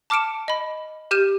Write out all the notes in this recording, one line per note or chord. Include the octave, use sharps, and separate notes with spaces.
A5 D6 F6 C#7 D7 E7
D#5 B5
G4 F6 G6 D#7 E7